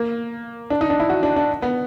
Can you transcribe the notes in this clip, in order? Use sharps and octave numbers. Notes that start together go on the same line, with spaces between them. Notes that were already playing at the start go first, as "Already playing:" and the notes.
Already playing: A#3
D4
D#4
D4
E4
F#4
D4
D4
B3